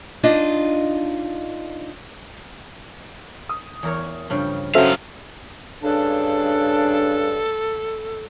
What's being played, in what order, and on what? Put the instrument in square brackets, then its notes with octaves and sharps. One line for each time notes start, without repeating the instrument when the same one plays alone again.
[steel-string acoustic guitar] D4 D#4 F4 D#5
[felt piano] D#6
[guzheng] E2 A#4 C#5
G2 C#3 F3
[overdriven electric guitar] F#3 F5 [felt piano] C#4 F#4 C5 [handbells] A4 E5
[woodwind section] G2 C#3 D4 [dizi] A4